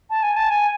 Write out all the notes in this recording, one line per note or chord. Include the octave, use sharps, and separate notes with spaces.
A5
G#5
A5
G#5